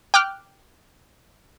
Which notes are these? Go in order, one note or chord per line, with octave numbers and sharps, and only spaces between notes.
G5 D6 F6 F#6